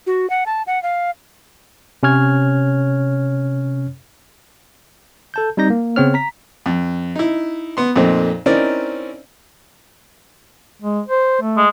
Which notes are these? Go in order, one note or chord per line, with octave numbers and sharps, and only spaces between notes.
F#4
F#5
A5
F#5
F5
C3 C#4 C#5 F6 G#6
A4 A5 G6
G3 C4 D#4 G6 A#6
A#3
C#3 B3 C4 C#5 F6
A#5 B6
F2
D#4 E4
B3 C6
F2 A#2 A3 C4 D#4
C4 C#4 D#4 E4 A#4 D5
G#3
C5
A3
G#3